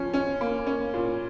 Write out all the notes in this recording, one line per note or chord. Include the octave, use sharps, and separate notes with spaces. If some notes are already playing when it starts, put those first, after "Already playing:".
Already playing: F3 C#4
C#4
A#3
C#4
A#2